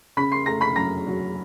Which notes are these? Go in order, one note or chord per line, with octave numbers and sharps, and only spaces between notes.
C#3 B5 B6
C6 C7
A3 A#5 A#6
B5 B6
F#2 A#5 A#6
F#3